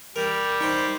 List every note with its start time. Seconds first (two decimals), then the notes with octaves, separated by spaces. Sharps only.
0.16 G3 A#4
0.61 D#4 C5 G5 C#6